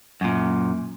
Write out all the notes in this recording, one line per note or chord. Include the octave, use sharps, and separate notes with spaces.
F#2 A#2